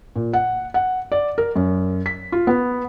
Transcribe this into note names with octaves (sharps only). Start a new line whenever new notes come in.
A#2
F#5
F#5
D5
A#4
F#2
B6
F4
B3